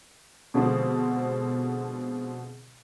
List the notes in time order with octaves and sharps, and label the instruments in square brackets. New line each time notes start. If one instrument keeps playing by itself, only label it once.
[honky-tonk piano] B2 D3 F3 G#3 C4